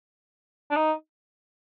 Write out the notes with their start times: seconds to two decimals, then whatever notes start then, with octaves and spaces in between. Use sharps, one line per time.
0.71 D4
0.76 D#4